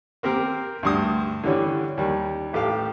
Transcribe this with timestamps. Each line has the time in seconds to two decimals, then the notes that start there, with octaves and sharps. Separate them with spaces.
0.23 A#3 C4 G4 A#4
0.83 D2 G2 D#6
1.43 D3 E3 G3 C#4
1.98 D#2 G3
2.53 A1 G4 A4 F5